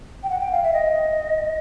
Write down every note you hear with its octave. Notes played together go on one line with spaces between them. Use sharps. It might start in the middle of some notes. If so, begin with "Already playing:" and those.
G5
F#5
G5
F5
E5
D#5